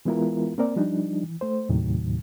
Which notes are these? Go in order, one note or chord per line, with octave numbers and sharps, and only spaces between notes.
E3 G#3 B3 E4 F4 A#4
A#3 C4 A#4 D5
F3 G3 D4 D#4
E3
A3 C5
D#2 A2 C3 D#3 F#3